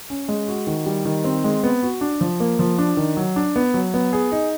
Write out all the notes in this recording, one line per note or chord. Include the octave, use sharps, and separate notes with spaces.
C#4
G#3
F#4
D#3
G3
D#3
C4
G#3
B3
F#4
D4
F3
A#3
F3
D4
D#3
F#3
D4
B3
F#3
B3
G#4
D#4